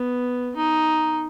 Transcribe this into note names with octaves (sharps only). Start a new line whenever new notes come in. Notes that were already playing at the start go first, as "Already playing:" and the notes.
Already playing: B3
D#4